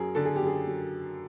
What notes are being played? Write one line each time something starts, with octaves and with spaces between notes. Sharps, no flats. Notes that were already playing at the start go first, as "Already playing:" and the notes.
Already playing: F#2 F#3 G#4 A#4
D3 A4
G#4
G4
F#2
G#4
F#3